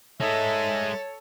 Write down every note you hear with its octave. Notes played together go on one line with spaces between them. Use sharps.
G#3 D#4 A4 C#5 E5